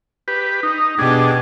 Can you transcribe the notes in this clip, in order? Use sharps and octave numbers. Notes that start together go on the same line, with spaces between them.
G4 B4
D#4
B2 D4 G4 G#4